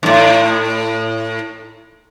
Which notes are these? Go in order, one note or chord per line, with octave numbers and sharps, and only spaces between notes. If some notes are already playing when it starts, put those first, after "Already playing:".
D#2 A2